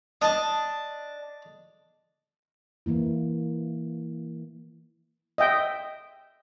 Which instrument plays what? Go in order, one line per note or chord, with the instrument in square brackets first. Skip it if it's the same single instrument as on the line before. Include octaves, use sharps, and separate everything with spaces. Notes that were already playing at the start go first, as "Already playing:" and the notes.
[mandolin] D4 [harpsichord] D#5 A5
[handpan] E3 A#3 E4
[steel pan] D#5 E5 G5